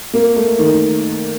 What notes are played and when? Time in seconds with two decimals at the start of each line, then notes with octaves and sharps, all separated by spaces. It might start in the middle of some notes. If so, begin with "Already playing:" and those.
0.13 A#3
0.36 A3
0.59 D#3